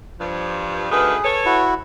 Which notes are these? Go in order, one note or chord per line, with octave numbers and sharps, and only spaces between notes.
G2 F3
D2 D#3 G#4 B4
A4 B4 C#5
E4 F#4